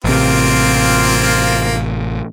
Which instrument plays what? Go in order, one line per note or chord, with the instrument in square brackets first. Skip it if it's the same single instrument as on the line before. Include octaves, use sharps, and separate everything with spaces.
[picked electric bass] A1 C3 [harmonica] A#3 C4 F4